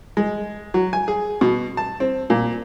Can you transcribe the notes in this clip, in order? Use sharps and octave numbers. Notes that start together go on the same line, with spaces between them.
G#3
F#3
G#5
G#4
B2
A5
C4
A#2